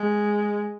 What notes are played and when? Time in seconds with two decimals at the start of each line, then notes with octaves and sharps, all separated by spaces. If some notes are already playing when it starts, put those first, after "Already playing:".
Already playing: G#3